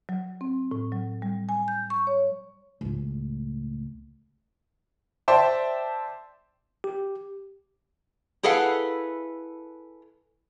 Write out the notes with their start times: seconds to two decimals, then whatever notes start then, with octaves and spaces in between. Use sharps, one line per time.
0.09 F#3
0.41 C4
0.71 A2
0.92 F#3
1.22 G3
1.49 G#5
1.68 G6
1.90 C#6
2.07 C#5
2.81 C#2 A2
5.28 C5 D5 E5 G5 A5
6.84 G4
8.43 E4 G#4 A4 B4 F5 F#5